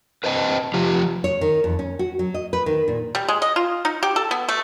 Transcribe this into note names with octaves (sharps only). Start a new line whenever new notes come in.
B4 C5 D#5 A5
F3 F4 G4
C#5
D#3
F2
C#4
F#4
F#3
D#5
B4
D#3
A#2
G3
G#3
D#5
F4
D#4
G4
A4
B3
A3